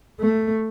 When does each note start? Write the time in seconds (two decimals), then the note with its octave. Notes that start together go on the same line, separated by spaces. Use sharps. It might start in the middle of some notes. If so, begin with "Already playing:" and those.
0.20 A3